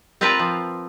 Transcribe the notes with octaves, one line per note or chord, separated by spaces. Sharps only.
C4 F4 A#4 B4 A5 A#5
F3